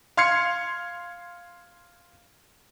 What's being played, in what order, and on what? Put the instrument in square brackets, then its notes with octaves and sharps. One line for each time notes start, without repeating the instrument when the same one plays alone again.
[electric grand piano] F5 C6 F6 G#6 C7 C#7